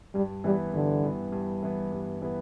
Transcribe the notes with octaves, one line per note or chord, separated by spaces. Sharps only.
G2 G3
E3 G3 B3
G2 D3
E3 B3
G2
E3 B3
G2
E3 B3